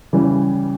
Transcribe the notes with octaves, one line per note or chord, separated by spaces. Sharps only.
C#3 E3 G3